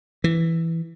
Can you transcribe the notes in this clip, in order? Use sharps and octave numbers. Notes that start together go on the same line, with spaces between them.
E3